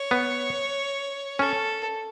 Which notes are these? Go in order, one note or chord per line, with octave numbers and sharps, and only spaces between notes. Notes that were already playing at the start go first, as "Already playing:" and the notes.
Already playing: C#5
B3
C#4 A4